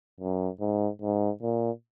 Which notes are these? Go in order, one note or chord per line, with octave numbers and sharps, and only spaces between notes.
F#2
G#2
G#2
A#2